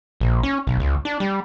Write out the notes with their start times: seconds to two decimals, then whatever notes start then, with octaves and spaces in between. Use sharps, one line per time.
0.20 A#1
0.43 C#4
0.67 B1
0.80 C#2
1.05 D4
1.20 G3